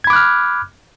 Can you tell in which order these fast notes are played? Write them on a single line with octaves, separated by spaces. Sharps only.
G#6 B5 D6 F#6 F6